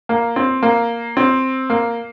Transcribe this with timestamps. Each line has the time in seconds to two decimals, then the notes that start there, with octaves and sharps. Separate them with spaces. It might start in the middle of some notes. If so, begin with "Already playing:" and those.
0.09 A#3
0.36 C4
0.63 A#3
1.17 C4
1.70 A#3